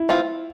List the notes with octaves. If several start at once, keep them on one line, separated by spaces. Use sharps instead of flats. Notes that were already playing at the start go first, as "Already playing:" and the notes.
Already playing: E4
E3 A3 C4 F4